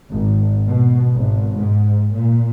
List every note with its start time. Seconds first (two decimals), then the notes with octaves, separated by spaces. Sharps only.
0.12 G#1
0.68 B2
1.16 G#1
1.58 G#2
2.13 A#2